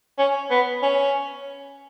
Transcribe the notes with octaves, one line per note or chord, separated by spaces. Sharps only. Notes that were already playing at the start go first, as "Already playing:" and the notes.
C#4
B3
C#4